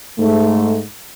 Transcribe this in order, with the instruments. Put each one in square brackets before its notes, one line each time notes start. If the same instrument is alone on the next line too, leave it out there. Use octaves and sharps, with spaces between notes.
[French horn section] G#2 A3